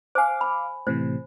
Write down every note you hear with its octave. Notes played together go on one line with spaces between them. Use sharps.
C5 F5 G#5 D6
B5
A2 C3 E3 C5